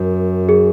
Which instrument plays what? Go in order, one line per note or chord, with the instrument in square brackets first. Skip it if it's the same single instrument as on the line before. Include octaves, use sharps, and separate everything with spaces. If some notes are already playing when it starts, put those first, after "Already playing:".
Already playing: [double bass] F#2 [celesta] A#4
[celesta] G#4